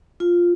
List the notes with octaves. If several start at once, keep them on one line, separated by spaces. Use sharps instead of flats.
F4